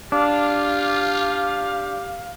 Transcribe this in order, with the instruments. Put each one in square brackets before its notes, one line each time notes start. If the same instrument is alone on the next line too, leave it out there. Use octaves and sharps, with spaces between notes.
[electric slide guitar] D4 [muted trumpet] F4 [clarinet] G4 [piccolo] F5